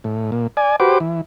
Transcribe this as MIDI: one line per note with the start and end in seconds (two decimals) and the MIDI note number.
0.04 0.31 45
0.32 0.47 46
0.57 0.76 74
0.57 0.76 80
0.80 0.98 66
0.80 0.98 67
0.80 0.98 71
0.80 0.98 72
0.80 0.98 86
1.00 1.21 52